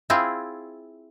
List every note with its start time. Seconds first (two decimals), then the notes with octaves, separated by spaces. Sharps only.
0.10 C4 E4 F4 G#4